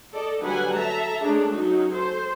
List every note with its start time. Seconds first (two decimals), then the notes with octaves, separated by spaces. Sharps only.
0.13 A4 D5 D#5
0.43 D3 F#3 G3 B4 F#5 G#5
0.73 A4 E5 A5 A#5
1.23 G#3 A3 C#4 D4 G#4
1.52 F#3 C#4 D#4 F#4
1.93 A4 C5